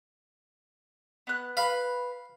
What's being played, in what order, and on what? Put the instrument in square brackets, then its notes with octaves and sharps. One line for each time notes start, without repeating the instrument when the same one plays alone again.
[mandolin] B3 F#6
[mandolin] B4 B5 [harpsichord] F5